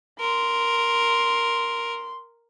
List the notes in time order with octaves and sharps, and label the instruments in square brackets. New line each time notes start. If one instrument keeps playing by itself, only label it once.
[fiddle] A#4 [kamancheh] C6